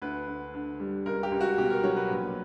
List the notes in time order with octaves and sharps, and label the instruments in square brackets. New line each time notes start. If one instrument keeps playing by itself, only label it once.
[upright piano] D2 B4
D2
D3
G3
C#2 A#4
G4
C#2
F#4
B2 G4
A#4
F#3 C#5
B4
A#1